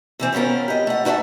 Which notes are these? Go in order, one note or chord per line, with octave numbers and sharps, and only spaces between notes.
C3 E3 C4
D#3 B3 C#4 F4 A#4
G4 D#5
A3 F#5
D#4 F#4 C#5 E5 A5